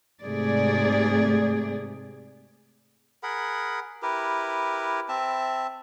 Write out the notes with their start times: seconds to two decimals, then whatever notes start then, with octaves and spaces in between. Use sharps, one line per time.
0.23 G#2 C3 A3 G#4 D5
3.23 G#4 A#4 F#5 B5
4.02 E4 G4 A#4 B4
5.09 C4 E5 A5